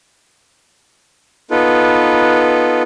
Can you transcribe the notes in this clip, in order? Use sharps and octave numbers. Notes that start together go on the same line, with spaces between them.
B3 D#4 F4 A4 B4